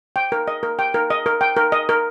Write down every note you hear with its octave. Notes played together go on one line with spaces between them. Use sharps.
G5
A#4
D#5
A#4
G5
A#4
D#5
A#4
G5
A#4
D#5
A#4